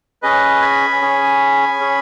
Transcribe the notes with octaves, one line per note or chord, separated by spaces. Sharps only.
C#4 G#4 B4 D#5
G#5 B5
C#4 G#4
C#4 G#4